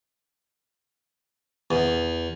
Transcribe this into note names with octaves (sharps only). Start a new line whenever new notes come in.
E2